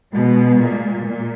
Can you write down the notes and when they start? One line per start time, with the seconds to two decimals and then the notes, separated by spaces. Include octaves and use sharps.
0.12 B2 G#3
0.59 A#2
1.06 A#2